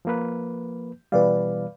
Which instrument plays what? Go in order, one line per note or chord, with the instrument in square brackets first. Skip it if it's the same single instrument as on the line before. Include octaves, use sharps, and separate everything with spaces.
[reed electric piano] F3 A#3 B4
[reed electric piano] B2 E3 G3 [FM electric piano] B4 D5 F5